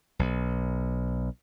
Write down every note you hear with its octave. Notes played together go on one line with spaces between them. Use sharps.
B1